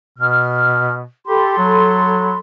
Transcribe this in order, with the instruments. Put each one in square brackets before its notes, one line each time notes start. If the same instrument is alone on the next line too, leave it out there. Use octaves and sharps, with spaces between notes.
[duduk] B2 [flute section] F6
[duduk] G4 [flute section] A4 B5 C6
[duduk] F#3